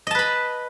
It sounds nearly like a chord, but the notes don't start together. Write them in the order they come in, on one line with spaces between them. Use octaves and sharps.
D#5 A5 B4 B5